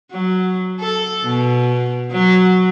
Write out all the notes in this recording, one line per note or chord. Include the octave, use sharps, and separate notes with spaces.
F#3
A4
B2
F#3